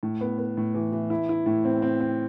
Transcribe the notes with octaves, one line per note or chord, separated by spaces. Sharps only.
A2
B3
B3
A2
E3
E3
E4
E4
A2
C4
C4
C4